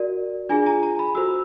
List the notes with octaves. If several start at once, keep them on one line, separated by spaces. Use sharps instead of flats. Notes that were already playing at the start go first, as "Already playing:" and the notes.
Already playing: F#4 A#4 D5
D4 F4 G#4 G#5
A#5
A#5
B5
F#4 A4 C5 E6